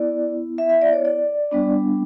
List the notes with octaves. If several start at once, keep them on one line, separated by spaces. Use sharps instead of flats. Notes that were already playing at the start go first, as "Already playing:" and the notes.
Already playing: B3 E4 D5
E5
E5
D5
C#5
D5
G3 B3 D4